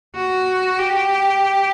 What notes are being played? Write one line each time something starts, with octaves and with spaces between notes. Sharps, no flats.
F#4
G4